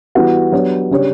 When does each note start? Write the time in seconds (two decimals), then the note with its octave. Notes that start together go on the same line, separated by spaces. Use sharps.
0.15 E3 G3 B3 F#4
0.52 F#3 B3 D4 G4 C#5
0.90 C#3 G3 D4 G4 C#5